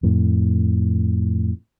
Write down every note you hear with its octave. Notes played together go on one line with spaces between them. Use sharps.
F2 A2